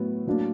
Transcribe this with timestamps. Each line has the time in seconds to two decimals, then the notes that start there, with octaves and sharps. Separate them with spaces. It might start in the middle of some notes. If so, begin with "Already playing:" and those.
Already playing: A2 F#3 B3
0.27 A2 F#3 A#3 D4